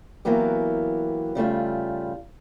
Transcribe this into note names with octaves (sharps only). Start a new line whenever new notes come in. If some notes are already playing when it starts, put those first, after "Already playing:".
E3 F#3 A#3 B3 G4
C#3 G3 A3 F4